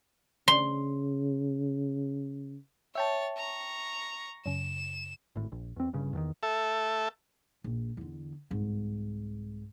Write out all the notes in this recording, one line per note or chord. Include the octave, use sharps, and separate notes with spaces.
C#3 C6
C#5 E5 G5 A5 A6
A#5 C#6
F#2 C#3 E7
G#1 A2
A#1
E2 C4
G1 G2 C#3
E2 D3 D#3
A4 E5
A#1
E2 D3
C2 G#2